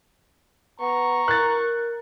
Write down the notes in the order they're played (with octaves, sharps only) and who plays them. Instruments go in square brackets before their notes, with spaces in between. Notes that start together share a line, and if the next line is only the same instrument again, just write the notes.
[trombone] B3 [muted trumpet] A#5 [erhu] C#6
[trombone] A#4 [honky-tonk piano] F#6 A6